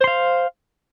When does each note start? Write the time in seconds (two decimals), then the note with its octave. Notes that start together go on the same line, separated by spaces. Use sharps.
0.01 C5
0.04 C6
0.07 F5